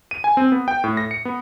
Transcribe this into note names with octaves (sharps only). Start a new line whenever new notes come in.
D#7
G#5
C4
B3
G5
A2
A#6
C#7
B3